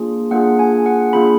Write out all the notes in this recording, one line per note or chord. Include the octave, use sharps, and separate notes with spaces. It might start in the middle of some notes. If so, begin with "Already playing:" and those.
Already playing: A#3 D4 F4 G#4
A#3 D4 F4 G#4 F#5
G#5
F#5
A#3 D4 F4 G#4 B5